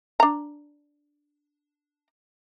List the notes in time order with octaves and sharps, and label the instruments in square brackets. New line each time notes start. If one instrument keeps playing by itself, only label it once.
[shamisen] D4 A#5